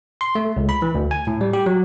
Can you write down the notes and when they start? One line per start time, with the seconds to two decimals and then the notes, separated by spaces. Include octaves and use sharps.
0.21 C6
0.35 A3
0.56 C#2
0.69 B5
0.82 E3
0.95 D2
1.11 G#5
1.27 A2
1.41 G3
1.53 G4
1.66 F#3